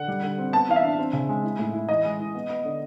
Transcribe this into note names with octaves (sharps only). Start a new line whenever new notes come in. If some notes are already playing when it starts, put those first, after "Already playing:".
Already playing: D3 F#5
G3
D3
C4
B3 A5
E3 F5
E5
D4
C4
C#3
G#3
E4
A2
E4
E3 D#5
G#3
E3
B3
B3
D3